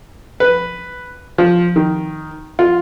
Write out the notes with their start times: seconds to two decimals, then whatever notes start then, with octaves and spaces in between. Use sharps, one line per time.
0.40 B4
1.38 F3
1.76 D#3
2.59 F4